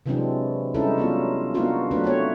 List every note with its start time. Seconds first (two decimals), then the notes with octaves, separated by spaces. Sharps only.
0.06 C3 E3 F#3 G#3 C4 D4
0.74 G3 G#3 C#4 D#4 E4 A4
0.98 F#3 B3 F4
1.54 A#3 B3 D4 D#4 F4 F#4
1.91 F#3 A3 C4 D4 B4
2.04 A3 B3 C#5